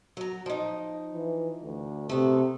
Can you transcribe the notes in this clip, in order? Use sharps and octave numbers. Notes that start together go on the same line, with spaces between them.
F#3 A#5
F3 D#4
E3
D2
C3 A3 B3